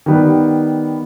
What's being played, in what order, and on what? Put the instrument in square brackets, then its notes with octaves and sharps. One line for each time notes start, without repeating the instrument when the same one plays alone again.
[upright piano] D#3 G3 B3